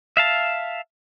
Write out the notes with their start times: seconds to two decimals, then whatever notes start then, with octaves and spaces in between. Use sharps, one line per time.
0.17 E5 F5 A5